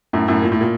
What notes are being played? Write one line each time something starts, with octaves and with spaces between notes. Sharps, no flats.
F#2 A2
F#2 A2
A#2
A2
A#2